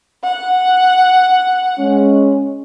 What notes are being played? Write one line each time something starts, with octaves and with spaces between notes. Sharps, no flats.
F#5
G#3 C#4